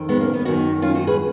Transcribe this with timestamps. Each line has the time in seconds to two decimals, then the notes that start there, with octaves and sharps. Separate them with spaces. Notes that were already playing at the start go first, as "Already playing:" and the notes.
Already playing: F2 D#3
0.09 G#3 B3
0.21 A#3 C#4
0.33 B3 D#4
0.45 F#2 D#3 D#4 F#4
0.82 C#4 F4
0.95 D#4 F#4
1.07 G#4 B4